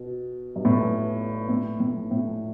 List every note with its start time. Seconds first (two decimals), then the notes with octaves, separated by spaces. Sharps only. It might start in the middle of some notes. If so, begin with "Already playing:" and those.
Already playing: B2
0.56 G2
0.65 A2
0.75 G2
1.49 A2
1.80 A2
2.11 A2